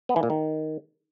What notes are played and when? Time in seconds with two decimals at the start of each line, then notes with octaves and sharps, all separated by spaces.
0.09 B3
0.16 E3
0.23 A#2
0.30 D#3